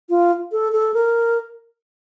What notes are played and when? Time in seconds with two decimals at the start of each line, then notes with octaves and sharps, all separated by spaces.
0.10 F4
0.52 A4
0.72 A4
0.94 A#4